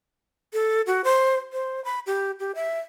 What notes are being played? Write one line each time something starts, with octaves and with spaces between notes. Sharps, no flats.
A4
F#4
C5
C5
B5
G4
G4
E5